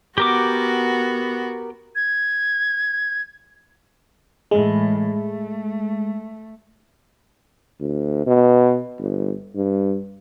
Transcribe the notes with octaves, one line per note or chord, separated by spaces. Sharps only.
B3 F#4 G4 A#4 D6
G#6
A2 E3 G#3
A3
D2
B2
G1
G2